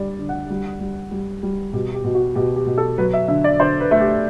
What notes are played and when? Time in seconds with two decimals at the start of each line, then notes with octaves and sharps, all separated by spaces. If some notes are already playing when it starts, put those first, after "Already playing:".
Already playing: D3 G3 D5
0.19 D3
0.29 F#5
0.50 G3
0.80 G3
1.11 G3
1.43 G3
1.73 B2 G4
1.94 G4
2.04 B2
2.15 F#4
2.35 B2 G4
2.56 G4
2.67 B2
2.78 A4
2.98 F#3 B4
3.13 E5
3.28 D3 E5
3.44 D5
3.60 D3 C5
3.80 B4
3.91 A3
4.00 G4